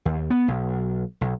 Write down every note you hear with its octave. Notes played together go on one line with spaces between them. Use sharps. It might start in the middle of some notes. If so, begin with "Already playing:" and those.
D#2
B3
B1
B1